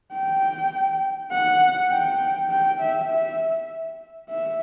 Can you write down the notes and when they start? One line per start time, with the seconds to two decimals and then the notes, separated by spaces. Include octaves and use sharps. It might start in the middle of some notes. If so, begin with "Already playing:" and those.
0.13 G5
1.31 F#5
1.91 G5
2.50 G5
2.80 E5
3.11 E5
4.30 E5